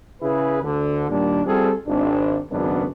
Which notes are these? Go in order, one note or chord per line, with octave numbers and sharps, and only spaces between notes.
C#3 E4 G#4 B4
D2 D3
D#2 A#2 G3 D4
G3 C4 F4 G#4 A4
G#1 D4
G#1 F#2 C#3 B3 D4